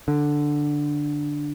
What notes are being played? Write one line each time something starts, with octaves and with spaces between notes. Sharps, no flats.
D3